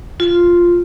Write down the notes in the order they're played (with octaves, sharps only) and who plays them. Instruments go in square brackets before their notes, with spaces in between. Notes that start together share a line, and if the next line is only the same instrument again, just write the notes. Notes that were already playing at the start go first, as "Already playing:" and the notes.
[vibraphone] F4